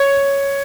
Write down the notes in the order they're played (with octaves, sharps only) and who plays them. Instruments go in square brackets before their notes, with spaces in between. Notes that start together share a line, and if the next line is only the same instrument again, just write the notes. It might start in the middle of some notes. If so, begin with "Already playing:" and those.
Already playing: [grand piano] C#5